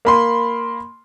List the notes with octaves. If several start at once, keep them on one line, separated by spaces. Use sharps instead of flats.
A#3 B5 C6